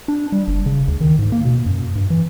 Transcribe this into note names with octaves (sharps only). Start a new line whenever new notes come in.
D4
G3
F#1
C#3
D2
D#3
G#2
A#3
B2
F#2
G2
E3